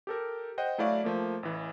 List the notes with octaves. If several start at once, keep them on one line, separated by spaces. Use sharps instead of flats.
G4 A4 A#4
C5 D#5 F#5 G5
F#3 A3 E4 F#4 D5 F5
F3 A3 A#3
A1 E3